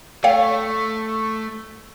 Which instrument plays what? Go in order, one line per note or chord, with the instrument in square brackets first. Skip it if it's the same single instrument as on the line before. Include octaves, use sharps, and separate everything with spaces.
[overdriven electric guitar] A3 [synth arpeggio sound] C#5 F5 G5